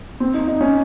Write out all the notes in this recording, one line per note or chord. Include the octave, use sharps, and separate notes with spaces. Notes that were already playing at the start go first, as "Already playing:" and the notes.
C4
D#4
D#4
C#4